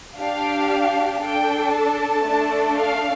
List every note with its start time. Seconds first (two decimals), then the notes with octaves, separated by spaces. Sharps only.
0.18 D4 G4 F5
1.21 D4 A4 G5
1.74 A5
2.25 A3 D4 A4
2.77 F5